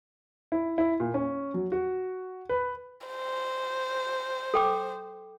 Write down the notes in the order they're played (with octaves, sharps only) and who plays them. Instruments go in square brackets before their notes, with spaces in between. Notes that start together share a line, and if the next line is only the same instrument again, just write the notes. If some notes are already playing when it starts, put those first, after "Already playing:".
[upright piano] E4
E4
A#2
C#4
F#3
F#4
B4
[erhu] C5
[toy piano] A4 G5 D6